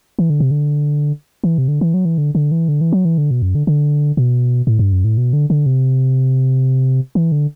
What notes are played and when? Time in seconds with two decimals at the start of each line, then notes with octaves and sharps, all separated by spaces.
0.19 E3
0.30 D3
0.40 C3
0.51 D3
1.44 E3
1.58 C3
1.68 D3
1.81 E3
1.94 F#3
2.05 E3
2.18 D3
2.35 D3
2.52 E3
2.68 D3
2.81 E3
2.92 F#3
3.05 E3
3.18 D3
3.31 B2
3.42 F#2
3.55 D3
3.67 D3
4.17 B2
4.67 A2
4.79 G2
4.92 F#2
5.04 A2
5.17 B2
5.33 D3
5.50 D3
5.66 C3
7.15 E3
7.32 D3